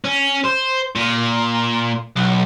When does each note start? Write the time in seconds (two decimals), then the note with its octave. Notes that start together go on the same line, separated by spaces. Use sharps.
0.04 C#4
0.45 C5
0.95 A#2
2.17 B1